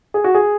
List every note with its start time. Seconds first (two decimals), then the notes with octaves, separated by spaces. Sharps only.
0.14 G#4
0.24 F#4
0.35 G#4